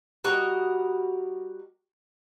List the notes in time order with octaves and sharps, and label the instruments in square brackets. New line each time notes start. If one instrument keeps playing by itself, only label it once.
[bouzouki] G3 F#4 A#4 D#5